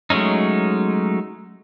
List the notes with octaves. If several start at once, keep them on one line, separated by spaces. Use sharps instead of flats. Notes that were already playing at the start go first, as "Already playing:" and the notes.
F#3 G#3 A3 C#4 D#4